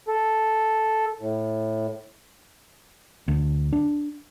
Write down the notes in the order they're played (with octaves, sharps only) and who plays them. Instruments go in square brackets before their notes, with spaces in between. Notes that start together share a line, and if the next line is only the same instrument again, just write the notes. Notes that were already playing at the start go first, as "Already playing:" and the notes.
[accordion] A4
A2
[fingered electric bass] D2
D4